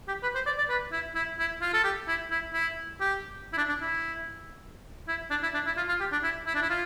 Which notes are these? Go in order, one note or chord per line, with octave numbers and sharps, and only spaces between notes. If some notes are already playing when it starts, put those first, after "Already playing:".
G4
B4
C5
D5
D5
B4
E4
E4
E4
F4
A4
G4
E4
E4
E4
G4
E4
D4
D4
E4
E4
D4
E4
D4
E4
F4
F4
G4
D4
E4
E4
D4
E4
F4